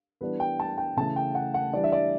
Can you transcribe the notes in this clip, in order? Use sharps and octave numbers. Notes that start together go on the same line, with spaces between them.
E3 G3 B3 D4 B4
G5
A5
G5
C#3 E3 A3 A5
G5
F#5
F#5
E3 G3 D4 D5
E5
D5